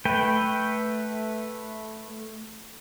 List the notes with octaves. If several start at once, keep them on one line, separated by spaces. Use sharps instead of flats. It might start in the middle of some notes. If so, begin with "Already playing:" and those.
A3 B4 G5